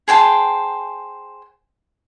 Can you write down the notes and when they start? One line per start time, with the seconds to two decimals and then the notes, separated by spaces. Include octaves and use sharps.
0.08 G#4 C5 G5 A5